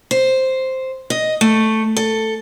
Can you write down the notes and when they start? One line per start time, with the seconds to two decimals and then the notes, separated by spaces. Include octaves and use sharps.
0.11 C5
1.10 D#5
1.41 A3
1.97 A4